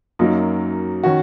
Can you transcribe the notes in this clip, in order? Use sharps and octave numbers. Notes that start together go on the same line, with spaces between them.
F#2 F#3 A#3 D#4
D#3 C#4 F#4